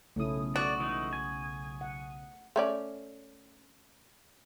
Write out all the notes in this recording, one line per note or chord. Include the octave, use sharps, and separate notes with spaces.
B1 C#3 A3 C#4 E4 D#6
F#4 D5
E3 G#3 D#4
G#5
F#5
A3 C#4 D5